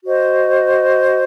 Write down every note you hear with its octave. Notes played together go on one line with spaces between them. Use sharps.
F#4 C5 D#5